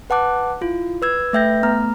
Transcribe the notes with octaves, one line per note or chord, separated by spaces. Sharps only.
B4 F#5 A5 D6 F#6
E4 F4
B4 E6 G#6
A3 B4 E5 G5 G6 A#6
A3 B3 A#5 F6